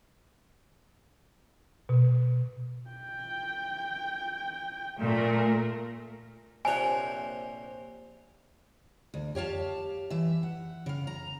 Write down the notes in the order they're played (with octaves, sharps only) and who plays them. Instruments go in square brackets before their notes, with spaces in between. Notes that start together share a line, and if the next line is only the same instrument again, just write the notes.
[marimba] B2
[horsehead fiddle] G5
[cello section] A#2 A3 [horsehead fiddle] A#4
[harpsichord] A#1 C3 C#5 [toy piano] C5 G#5
[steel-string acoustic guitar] D2
G4 C#5 F5 A5
E3 E5
F#5
C#3 F5
A#5